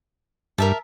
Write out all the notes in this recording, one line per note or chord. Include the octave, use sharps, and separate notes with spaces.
G2 A#4 E5 A5